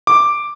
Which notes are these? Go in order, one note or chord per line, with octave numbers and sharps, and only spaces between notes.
D6